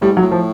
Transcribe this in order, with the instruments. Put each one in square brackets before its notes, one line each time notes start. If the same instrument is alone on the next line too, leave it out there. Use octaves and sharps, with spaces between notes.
[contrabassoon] A2 [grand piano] G3
[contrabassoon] G#2 [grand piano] F#3
[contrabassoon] A2
[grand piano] F3